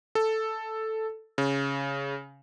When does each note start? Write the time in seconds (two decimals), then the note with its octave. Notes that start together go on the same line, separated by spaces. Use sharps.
0.15 A4
1.38 C#3